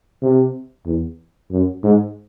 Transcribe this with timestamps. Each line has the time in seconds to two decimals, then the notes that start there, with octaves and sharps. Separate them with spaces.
0.22 C3
0.86 E2
1.51 F#2
1.83 G#2